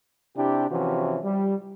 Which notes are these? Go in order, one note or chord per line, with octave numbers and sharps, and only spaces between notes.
C3 D4 E4 G4
C3 E3 F3 C#4 F#4
G3